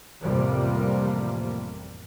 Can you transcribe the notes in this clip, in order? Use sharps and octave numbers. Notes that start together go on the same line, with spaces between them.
A1 F2 C3 F3 G3 A#3